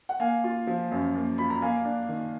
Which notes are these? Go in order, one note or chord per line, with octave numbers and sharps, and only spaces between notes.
F#5
A#3 F5 G#5
F4
F3
F#2
A#3
F4 B5
A#5
A#3 F5 G#5
D4
D#3